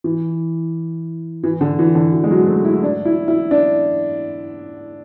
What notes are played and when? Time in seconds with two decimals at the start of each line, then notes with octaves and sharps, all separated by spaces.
0.04 E3
1.43 E3
1.61 D3
1.79 E3
1.95 D3
2.13 E3
2.24 G#3
2.31 F#3
2.47 A3
2.65 E4
2.83 D4
3.05 E4
3.28 E4
3.51 D4